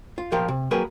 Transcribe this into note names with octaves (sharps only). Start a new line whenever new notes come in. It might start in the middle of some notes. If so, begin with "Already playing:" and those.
F4
B1 A#2 F3 G4 A#4 F5
C3
F#3 A#3 G4 G#4 A#4 B4